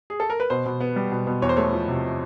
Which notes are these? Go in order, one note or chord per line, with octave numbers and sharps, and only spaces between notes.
G#4
A4
A#4
B4
B2 C5
B2
B3
G3
B2
B2
E2 C#5
C5
A3 C#5
F3
C3